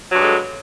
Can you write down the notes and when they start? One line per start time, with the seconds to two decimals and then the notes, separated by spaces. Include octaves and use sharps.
0.11 F#3
0.15 G2
0.18 G#3
0.22 D3